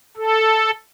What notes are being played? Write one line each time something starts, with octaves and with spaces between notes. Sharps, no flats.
A4